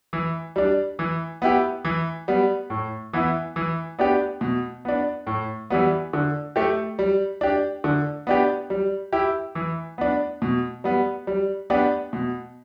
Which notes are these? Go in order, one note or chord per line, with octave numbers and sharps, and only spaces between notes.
E3
G3 D4
E3
B3 E4 G4
E3
G3 B3
A2
E3 B3 E4
E3
B3 D4 G4
B2
B3 D4
A2
E3 G3 B3
D3
A3 G4
G3
D4 G4
D3
B3 D4 G4
G3
E4 G4
E3
B3 D4
B2
G3 B3
G3
B3 D4 G4
B2